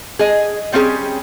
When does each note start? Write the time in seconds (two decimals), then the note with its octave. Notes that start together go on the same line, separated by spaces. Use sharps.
0.19 G#4 D#5
0.72 G3 C4 C#4 E4 G#4